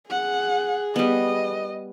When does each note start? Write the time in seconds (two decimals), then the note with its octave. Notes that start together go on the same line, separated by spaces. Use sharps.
0.11 G#4 F#5
0.96 G3 B3 D#5